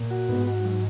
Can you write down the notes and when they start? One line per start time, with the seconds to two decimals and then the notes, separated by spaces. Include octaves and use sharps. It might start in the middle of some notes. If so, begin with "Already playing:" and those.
Already playing: A#2
0.11 F#4
0.29 G#2 B3
0.47 F#4
0.65 F#3